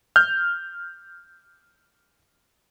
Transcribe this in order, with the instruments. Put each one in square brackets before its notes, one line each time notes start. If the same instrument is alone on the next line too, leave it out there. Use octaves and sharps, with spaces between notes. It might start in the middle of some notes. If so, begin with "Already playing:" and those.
[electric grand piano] F6 G6